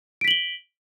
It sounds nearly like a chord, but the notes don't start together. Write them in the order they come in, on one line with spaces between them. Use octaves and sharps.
D7 B6 F#7 G7